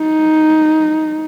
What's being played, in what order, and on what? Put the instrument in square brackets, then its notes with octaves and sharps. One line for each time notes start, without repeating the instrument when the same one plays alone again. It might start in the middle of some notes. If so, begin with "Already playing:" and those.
Already playing: [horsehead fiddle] D#4